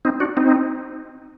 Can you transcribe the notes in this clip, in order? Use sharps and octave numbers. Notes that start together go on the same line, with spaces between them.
C4 D#4
D4 F#4
C4 D#4